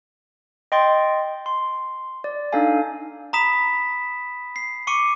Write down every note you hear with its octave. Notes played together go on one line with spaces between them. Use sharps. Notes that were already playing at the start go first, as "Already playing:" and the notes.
D#5 G5 C6 A6
C6
D5
D4 D#4 A4 F5 G#5
A#5 B5 D#6 B6 E7
C7
C#6 D6 C#7 D#7